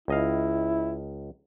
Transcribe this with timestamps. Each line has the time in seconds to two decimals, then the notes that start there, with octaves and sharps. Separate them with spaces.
0.08 C#2 E4 D#5 F5